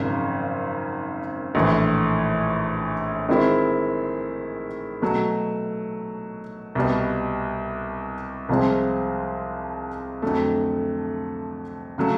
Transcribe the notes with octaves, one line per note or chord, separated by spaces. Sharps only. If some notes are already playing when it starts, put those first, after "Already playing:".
Already playing: G#1 F#2 C#3 F3
A#1 A2 E3
D#3 G#3 C4 E4
B2 F#3 A3
C2 B2 G3 B3
C2 C3 F3 G#3 C4
F2 D3 F#3 A3
C#3 F#3 A3